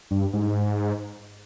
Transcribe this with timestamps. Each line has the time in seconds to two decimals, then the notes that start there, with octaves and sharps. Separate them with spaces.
0.11 G2
0.33 G#2